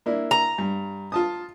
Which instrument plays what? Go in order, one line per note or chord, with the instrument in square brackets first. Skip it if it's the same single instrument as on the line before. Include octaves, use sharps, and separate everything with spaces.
[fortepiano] A#3 D4 E4
[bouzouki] A#5
[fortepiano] G2
F4 A5 D#6